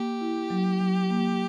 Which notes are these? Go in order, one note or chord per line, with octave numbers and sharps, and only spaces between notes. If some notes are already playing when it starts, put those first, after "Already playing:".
Already playing: A#3 G4
E4
F#3
F#3
A#3